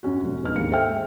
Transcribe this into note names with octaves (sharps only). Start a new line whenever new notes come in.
F#2 C#4 F#4
F1 F#3
E1 B3 D#4 F6
D#2 G#2 A#3 F5 C#7
A4 C5 E5 F5 G5 F6
G#3